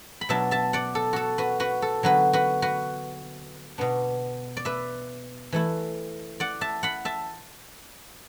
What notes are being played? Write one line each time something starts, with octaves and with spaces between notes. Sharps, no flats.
B5
B2 F#3 D4 E5 A5
E5 A5
D5 F#5
A4
F#4 A4
F#4 B4
F#4 B4
A4
D3 F#3 B3 F#4 B4
F#4 B4
F#4 B4
B2 B3 D4
D5
B4 E5
E3 A3 E4
D5 F#5
E5 A5
F#5 B5
E5 A5